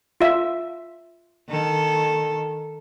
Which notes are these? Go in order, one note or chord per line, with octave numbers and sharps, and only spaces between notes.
F4 E5
D#3 A4